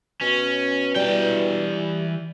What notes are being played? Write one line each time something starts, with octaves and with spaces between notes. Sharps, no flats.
B2 C#4
E3 G3 G5